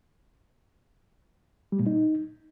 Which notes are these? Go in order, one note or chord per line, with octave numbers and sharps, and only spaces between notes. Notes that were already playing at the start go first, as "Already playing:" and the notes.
G3
A#2
D#4